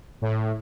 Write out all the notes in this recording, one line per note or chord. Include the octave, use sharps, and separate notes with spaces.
A2